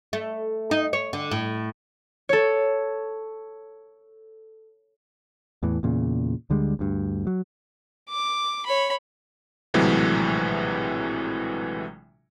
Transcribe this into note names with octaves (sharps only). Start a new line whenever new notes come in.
A3
D#4
C#5
D3
A2
A4 C#5
E2 A2 E3
E2 A#2 C#3
D2 D3 G3 G#3
D2 G2
F#3
D6
C#5 B5
A#1 A2 C3 E3 F#3 G#3